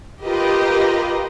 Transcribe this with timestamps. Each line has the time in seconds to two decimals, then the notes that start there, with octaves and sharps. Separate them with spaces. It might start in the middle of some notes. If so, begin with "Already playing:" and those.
0.25 F4 G4 A#4 B4 D#5